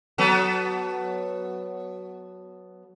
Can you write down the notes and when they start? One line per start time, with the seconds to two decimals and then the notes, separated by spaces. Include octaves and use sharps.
0.18 F#3 B3 A4